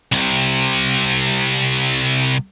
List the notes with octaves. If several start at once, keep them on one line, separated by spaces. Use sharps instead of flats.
C2 C3